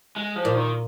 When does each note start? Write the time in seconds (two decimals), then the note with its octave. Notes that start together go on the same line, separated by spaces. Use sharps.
0.16 G#3
0.36 F3
0.45 A#2
0.55 D#3